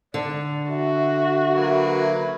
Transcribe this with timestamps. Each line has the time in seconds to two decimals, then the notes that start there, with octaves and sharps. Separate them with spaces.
0.14 D3 D5
0.70 F#4 E5
1.54 F#3 A#3 B4